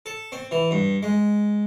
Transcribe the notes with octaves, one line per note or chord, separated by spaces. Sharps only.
A4
C4
E3
G2
G#3